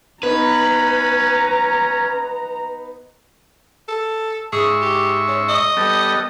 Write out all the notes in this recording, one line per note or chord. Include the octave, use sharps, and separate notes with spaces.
B3 C#4 D#4 B4 A#5
A4
G#2 G#4 E5 C#6
G4
C#4
D#5
G3 B3 A4